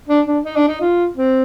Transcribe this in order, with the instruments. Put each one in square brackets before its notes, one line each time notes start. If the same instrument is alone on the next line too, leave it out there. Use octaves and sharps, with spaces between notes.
[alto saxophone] D4
D4
D#4
D4
D#4
F4
C4